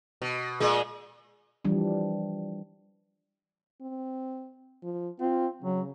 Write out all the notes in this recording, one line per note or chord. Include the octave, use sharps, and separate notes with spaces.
B2
A#2 G#3
E3 F3 G3 D4
C4
F3
C4 F4
C#3 F#3